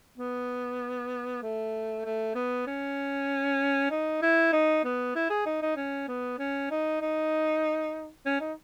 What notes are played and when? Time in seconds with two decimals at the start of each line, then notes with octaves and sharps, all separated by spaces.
0.18 B3
1.42 A3
2.05 A3
2.35 B3
2.67 C#4
3.91 D#4
4.22 E4
4.53 D#4
4.84 B3
5.15 E4
5.30 G#4
5.46 D#4
5.62 D#4
5.76 C#4
6.08 B3
6.39 C#4
6.71 D#4
7.01 D#4
8.26 C#4
8.40 D#4